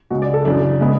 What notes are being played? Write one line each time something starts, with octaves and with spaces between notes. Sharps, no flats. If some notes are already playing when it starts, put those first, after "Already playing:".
C#2 C#3 G#3 F#4
D5
A4
F#2 C#3 E3 D4
C#3 G#3 B3